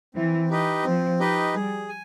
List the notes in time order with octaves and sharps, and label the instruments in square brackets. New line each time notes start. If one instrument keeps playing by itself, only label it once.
[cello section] E3 [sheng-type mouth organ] C4
[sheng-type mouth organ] D#4 G4 B4 D#5
[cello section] F3 [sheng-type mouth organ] C4
[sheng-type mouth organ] D#4 G4 B4 D#5
[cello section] G3 [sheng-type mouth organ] G#4
[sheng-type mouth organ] G#5